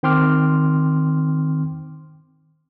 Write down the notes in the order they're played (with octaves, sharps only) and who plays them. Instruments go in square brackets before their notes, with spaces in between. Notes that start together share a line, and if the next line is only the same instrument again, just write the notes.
[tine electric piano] D#3 C4 G5 C6 D6 F6